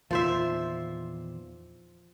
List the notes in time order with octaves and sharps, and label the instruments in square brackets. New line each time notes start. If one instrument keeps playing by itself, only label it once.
[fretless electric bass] E2 A#2 D#3 [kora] F3 C5 E5